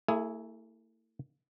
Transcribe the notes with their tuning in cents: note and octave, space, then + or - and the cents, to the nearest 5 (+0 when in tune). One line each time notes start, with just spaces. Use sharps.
A3 +45 E4 -10 G#4 +0